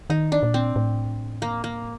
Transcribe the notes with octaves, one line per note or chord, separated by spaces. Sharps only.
D#3 D#4
D4
A#2
C4
A2
A#3
A#3